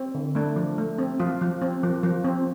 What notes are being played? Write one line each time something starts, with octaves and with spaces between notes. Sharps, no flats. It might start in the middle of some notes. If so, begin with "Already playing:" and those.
Already playing: C4
D3
A3 D4
F3
A3
C4
F3 F4
F3
C4
F3
F3
C4